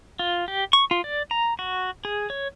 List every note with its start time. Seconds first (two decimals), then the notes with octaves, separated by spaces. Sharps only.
0.19 F4
0.48 G4
0.73 C#6
0.91 F4
1.04 D5
1.31 A#5
1.59 F#4
2.05 G#4
2.30 C#5